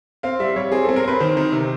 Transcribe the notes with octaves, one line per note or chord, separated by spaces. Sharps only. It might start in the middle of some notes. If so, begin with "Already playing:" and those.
C4 F5
G3 E5
G3 C#5
C4 G#4
C4 A4
A#4
C4 B4
D#3 C5
D#3
C3